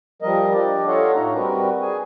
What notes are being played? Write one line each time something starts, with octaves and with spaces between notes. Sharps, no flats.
F3 G3 A#4 D#5
D4 G4 D5
F4 A4 C#5 D#5 F5 F#5
A2 A3 D4 D#4 A#5
G3 C4 F#4 A#4 B4
G#4 G#5